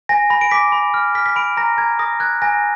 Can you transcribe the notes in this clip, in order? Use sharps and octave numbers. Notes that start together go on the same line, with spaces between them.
G#5 A#6
B5 A#6
D7
D6 B6
B5
F6
F6 B6
B6
B5 D7
A#5 A#6
A#5 G#6
D#6 A#6
F#6 G#6
G#5 A#6